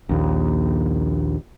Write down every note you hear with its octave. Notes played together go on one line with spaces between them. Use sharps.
A#1 D#2